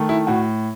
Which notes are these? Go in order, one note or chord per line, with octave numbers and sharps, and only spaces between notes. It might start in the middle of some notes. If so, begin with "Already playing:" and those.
Already playing: D#3 A3
E4
A2 F#4